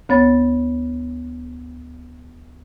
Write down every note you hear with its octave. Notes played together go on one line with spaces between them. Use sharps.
D2 B3 C#5 A6